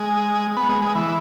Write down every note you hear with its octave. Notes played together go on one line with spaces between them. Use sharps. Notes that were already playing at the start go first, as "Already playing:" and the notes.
Already playing: G#3
B3
G#3
G#3
E3